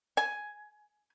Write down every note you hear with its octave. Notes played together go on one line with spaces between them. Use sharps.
G#5